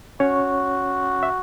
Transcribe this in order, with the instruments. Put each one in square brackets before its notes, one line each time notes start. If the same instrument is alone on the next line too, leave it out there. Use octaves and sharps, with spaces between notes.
[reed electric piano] C#4 C#5 [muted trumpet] F#4
[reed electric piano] E5